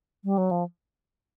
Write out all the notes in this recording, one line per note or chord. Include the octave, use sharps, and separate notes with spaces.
G3
F#3
F3